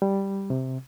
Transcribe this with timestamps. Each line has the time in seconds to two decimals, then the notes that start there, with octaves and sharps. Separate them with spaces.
0.02 G3
0.50 C3